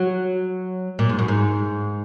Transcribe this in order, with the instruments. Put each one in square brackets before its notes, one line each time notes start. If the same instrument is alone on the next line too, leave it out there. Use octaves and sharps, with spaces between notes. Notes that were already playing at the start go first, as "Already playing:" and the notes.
Already playing: [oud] F#3
A#2
G#2
F#2
G#2